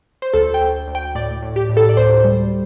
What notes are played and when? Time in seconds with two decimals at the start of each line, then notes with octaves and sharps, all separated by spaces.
0.22 C5
0.34 D2 A4
0.54 G5
0.61 D2
0.87 D2
0.95 G5
1.15 A2 D5
1.43 A2
1.56 G4
1.69 A2
1.77 A4
1.89 D5
1.97 D2 C5
2.24 G3